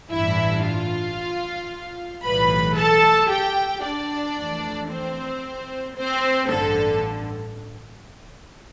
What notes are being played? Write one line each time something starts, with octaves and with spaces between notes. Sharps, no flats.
A1 G2 E3 G3 D4 E4 E5
F4 F5
B1 A2 E3 G3 B4 B5
A4 A5
G4 G5
D4 D5
F2 E3 A3
C4 C5
C4 C5
A1 G2 D3 A4